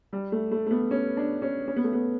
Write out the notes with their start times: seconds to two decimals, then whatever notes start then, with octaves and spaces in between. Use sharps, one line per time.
0.13 G3
0.32 A3
0.52 A3
0.67 A3
0.71 B3
0.91 C#4
1.17 D4
1.42 C#4
1.68 C#4
1.76 B3
1.84 A3
1.93 B3